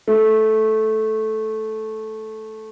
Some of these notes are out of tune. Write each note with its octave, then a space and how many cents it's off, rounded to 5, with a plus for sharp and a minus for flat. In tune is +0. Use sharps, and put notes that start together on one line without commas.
A3 -10